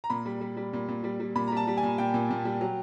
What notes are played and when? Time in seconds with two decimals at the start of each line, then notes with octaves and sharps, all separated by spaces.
0.04 A#5
0.10 A#2 B5
0.26 G3
0.41 G3
0.57 G3
0.73 A#2
0.88 A#2
1.04 G3
1.20 G3
1.35 A#2 B5
1.48 G3 A#5
1.57 A5
1.67 G3
1.77 G#5
1.83 A#2
1.98 A#2 G5
2.14 A#2
2.30 A#2
2.45 G3
2.61 F#3